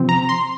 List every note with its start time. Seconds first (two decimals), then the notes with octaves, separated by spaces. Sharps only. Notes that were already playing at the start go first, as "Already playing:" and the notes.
Already playing: C3 F3 C4
0.09 A#5
0.29 C6